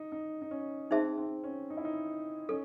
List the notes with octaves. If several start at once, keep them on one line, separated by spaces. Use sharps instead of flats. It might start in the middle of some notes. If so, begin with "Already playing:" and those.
Already playing: D#4
D#4
D#4
C#4
C4 D#4 G#4 C5 E5 A5
C4
C#4
D#4
E4
D#4
C#4 A4